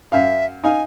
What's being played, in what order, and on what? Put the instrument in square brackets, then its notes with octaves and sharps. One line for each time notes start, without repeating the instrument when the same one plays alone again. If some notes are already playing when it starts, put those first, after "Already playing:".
[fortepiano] F#2 F5 [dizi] E5
[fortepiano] D#4 F5 [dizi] G#5